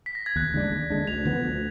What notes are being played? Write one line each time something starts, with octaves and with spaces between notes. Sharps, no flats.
B6
A#6
G#6
D#2 F#6
D3 G#3 D4
D#2
D3 G#3 D4
D2 F7
D3 F3 B3
D2